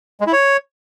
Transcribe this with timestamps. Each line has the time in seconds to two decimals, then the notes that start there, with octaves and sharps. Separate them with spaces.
0.20 G#3
0.27 E4
0.33 C#5